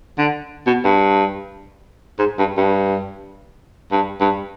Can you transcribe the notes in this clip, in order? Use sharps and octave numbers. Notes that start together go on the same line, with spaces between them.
D3
B2
G2
G#2
G2
G2
G2
G2